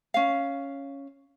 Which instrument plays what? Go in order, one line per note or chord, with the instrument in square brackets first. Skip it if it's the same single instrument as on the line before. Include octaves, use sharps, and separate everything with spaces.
[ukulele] C#4 F5